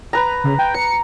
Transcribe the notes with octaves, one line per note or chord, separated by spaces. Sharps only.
B4 A#5
C#3
G5
A#5 C#7